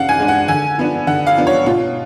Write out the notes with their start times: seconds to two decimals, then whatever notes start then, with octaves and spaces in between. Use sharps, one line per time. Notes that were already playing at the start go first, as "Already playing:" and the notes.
Already playing: C#3 D4 F5 F#5
0.09 G#5
0.20 G#3 D4
0.28 F#5
0.48 D3 G#5
0.78 F3 B3 D4
1.07 D3 F#5
1.27 F5
1.37 F3 B3 D4
1.47 C#5
1.66 B2 F4